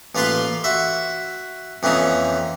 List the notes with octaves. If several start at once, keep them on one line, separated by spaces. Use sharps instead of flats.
A1 A#3 F4 B4 F5 C6
F#4 E5
F2 E3 A#3 C#4 D#4